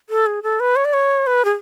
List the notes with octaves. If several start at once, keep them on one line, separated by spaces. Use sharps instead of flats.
A4
G#4
A4
B4
C#5
D5
C#5
B4
G#4